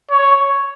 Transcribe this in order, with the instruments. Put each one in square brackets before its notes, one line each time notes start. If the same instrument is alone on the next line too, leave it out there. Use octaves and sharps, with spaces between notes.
[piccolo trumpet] C#5